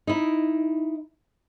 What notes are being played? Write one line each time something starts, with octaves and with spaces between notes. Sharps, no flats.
D#4 E4